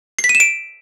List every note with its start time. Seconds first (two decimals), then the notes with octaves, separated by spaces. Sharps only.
0.19 C7
0.24 B6
0.29 D#7
0.35 E7
0.40 D7